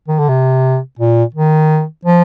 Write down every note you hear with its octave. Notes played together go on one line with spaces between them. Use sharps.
D#3
D3
C3
A#2
D#3
F3